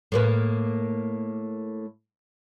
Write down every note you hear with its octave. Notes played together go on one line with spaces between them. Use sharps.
A2 A#3 B4